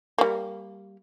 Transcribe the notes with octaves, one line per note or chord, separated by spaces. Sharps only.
G3 A#3